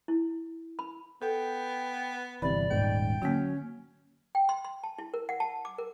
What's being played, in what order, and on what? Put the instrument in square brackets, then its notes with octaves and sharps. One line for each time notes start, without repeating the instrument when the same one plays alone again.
[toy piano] E4
B5
[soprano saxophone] B3 [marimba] A4 [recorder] G5
[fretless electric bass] G1 C3 E3 [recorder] D5 [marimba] B5
[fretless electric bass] D#1 G#2 G#3 [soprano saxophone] G5
[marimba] D3 A#3 [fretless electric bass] F#3 [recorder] C#4
[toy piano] G5
C6
C6
A5
E4
A#4
F#5
A5
D6
A#4